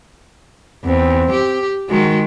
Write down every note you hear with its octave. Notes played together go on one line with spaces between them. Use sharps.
E2 C4
G4
D#3 G#3 F#4